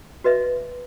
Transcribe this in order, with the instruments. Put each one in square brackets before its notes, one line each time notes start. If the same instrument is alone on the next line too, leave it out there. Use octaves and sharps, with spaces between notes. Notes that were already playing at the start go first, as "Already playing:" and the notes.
[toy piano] F#4 B4 D#5 E5